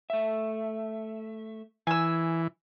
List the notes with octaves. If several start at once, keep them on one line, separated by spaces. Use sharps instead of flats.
A3 E5
E3 G#5 E6